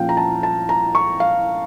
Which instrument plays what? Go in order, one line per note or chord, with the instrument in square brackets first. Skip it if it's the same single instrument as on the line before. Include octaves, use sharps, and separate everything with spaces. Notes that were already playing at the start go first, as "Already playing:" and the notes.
Already playing: [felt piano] A#2 F3 C#4 F5 G5
A#5
A5
A5
A#5
C#6
F5